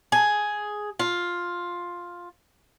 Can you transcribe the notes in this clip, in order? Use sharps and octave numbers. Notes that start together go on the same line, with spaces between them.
G#4
F4